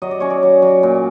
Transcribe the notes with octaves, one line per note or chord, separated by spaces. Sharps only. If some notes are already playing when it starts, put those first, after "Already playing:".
F#3 D#5
D5
C#4 C#5
D5
F#3
F#3
A#2